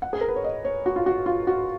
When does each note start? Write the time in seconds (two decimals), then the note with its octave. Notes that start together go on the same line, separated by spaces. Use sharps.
0.02 F#5
0.13 G#4
0.21 A#4
0.28 B4
0.36 C#5
0.44 D#5
0.65 C#5
0.86 F#4
0.96 F4
1.06 F#4
1.26 F4
1.47 F#4